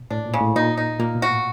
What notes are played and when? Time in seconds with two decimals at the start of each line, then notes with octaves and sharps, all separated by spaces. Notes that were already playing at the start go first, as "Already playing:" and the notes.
Already playing: B2
0.10 A2 D4
0.26 A#2
0.34 C#3
0.41 A2
0.56 A#2 D#4
0.77 D#4
1.00 A#2 A#3
1.15 B2
1.22 F#4
1.30 A2